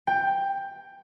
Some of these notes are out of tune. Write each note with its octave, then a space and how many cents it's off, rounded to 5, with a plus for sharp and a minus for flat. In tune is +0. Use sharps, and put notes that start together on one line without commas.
G5 +10